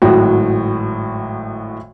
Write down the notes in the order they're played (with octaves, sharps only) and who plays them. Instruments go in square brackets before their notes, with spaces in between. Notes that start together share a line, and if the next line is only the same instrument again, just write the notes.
[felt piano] G#1 A2 F#3 F#4 G5